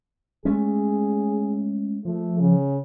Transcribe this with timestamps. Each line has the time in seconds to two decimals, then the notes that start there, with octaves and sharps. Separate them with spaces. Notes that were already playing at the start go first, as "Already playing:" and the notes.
0.45 G#3 A3 C#4 G#4
2.05 F3 A3
2.39 C#3